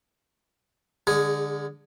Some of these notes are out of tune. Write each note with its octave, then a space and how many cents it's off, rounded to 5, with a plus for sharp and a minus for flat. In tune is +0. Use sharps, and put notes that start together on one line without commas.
D3 +0 G#3 -35 G#4 +0